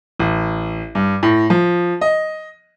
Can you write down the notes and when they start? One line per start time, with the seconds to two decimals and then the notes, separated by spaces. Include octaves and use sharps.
0.19 A1
0.95 G2
1.23 A2
1.50 F3
2.01 D#5